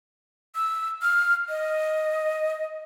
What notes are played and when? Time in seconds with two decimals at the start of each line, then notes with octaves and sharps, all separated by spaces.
0.55 E6
1.02 F6
1.49 D#5